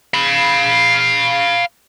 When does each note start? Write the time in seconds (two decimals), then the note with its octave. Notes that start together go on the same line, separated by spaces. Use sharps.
0.14 F5 B5